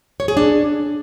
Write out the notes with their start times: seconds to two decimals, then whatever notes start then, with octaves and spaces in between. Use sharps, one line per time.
0.20 C#5
0.28 G#4
0.37 D4